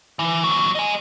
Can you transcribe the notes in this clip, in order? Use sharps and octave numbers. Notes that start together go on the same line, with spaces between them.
E3
D#2 F#3
D#5 G#5